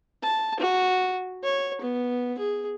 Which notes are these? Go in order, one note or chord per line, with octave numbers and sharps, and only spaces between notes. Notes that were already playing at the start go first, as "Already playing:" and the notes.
A5
F#4
C#5
B3
G#4